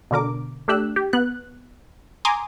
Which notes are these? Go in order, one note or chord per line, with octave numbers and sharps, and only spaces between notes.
B2 D3 A#4 D6
A3 D4 G4 E6 F#6
G4
B3 F#6
G#5 A#5 C6 D6 D#6